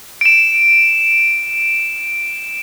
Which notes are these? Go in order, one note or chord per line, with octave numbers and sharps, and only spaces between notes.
D7 E7